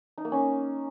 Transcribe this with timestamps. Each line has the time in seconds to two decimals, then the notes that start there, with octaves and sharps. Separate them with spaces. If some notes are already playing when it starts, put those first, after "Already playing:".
0.18 D#4
0.25 A#3
0.32 C#4